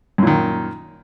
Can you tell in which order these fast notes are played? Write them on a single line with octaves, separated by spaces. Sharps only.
F#2 A#2 D#3